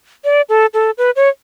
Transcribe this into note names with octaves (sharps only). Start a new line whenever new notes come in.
D5
A4
A4
B4
C#5